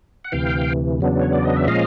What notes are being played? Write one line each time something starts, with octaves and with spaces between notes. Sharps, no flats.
F#5
D2 C3 E3 F5 G5
E2 C#3 F#3 B3 D4
C#5
D5
D#5
E5
A#2 F3 G#3 C#4 D#5 F5